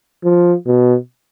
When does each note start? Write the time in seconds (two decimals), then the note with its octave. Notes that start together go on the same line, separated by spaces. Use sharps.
0.24 F3
0.66 B2